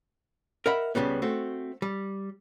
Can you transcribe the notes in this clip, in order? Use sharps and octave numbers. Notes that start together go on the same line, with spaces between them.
A#4 D#5 E5 F#5 B5
C#2 F#2 C#3 G3 B3
A3 C4 F#4
G3